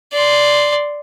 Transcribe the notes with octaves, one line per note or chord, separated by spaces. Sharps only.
D5 C6